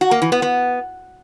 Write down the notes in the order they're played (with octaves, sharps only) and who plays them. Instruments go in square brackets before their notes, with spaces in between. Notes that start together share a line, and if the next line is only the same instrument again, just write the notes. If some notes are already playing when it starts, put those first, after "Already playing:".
[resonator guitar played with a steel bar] F#4
A#3
E3
B3
B3